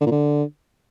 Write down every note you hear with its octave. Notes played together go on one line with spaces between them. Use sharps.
D3
A#2
D3